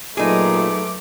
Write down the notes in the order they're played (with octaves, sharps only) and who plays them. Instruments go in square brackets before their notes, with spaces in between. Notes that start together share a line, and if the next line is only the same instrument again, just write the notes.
[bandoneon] A#2 [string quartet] F#3 B3 [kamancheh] A3 D6 [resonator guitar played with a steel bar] D#4 G#4